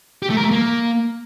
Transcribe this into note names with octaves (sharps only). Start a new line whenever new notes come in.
G4
A3
A#4
A3
A#3